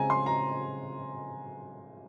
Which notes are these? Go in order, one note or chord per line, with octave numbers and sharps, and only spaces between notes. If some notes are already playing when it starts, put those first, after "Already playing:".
Already playing: C#3 G#3 C4 G#5 A#5
C6
A#5